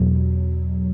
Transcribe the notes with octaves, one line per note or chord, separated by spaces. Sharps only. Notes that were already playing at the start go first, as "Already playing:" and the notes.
Already playing: E2 B2 F#3